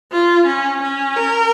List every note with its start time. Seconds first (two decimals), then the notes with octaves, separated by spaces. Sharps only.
0.12 F4
0.47 C#4
0.82 C#4
1.16 A#4